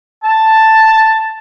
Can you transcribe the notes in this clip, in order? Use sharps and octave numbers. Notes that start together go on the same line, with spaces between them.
A5